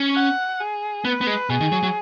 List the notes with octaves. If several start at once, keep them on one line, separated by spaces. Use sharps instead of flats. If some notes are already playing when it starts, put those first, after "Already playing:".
Already playing: C#4
F#5
G#4
B3 B4
B3
G#3
B2 G#4
D#3
F#3
F#3